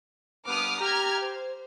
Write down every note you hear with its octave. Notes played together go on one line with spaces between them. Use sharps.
G2 B3 D6 D#6 F6
G4 A#5 F6 G#6
C5